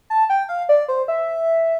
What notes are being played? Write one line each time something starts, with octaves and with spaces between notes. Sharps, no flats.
A5
G5
F5
D5
C5
E5